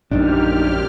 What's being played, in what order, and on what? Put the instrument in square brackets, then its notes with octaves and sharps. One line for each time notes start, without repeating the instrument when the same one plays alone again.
[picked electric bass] A#1 F#2 [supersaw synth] A#2 G4 F6 [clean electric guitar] D4 [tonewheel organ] D#4